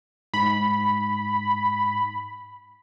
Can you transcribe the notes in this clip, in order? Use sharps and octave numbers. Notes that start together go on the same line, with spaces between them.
G#2 B5